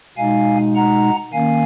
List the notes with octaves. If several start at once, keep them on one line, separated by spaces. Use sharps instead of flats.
B2 G#3 D#4 F5 G#5
F#5 A#5
D#3 A#3 C#4 F5 G#5